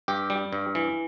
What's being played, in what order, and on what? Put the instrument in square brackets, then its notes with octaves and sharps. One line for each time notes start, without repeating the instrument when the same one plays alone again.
[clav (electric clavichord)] G2 G4
G3
G2
E3